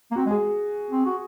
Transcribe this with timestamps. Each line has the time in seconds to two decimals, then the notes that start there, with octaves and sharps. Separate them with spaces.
0.11 A#3
0.16 C4 F#4
0.26 G#3 G#4
0.91 C4
1.06 F#4